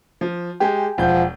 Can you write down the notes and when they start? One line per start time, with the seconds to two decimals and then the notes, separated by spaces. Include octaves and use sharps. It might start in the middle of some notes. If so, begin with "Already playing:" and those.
0.21 F3
0.60 G#3 G4 G5 G#5
0.98 E1 F3 F#5 G6